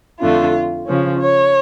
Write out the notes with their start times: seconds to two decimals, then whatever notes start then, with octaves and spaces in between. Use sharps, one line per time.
0.21 F2 D3 A3 F4
0.87 C#3 F3 C#4
1.20 C#5